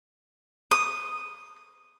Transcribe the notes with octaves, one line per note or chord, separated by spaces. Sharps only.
D#6